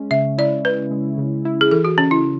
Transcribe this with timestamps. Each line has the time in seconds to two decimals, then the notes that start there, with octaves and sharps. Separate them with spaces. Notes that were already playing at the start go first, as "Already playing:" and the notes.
Already playing: G#3 C#4
0.11 C#3 E5
0.38 E4 D5
0.65 C#4 B4
0.91 G#3
1.18 C#3
1.45 E4
1.61 G#4
1.71 E3 A4
1.85 F#4
1.98 C#3 C#4
2.11 E4